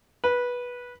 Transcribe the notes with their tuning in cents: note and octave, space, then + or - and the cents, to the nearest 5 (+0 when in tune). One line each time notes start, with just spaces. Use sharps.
B4 -15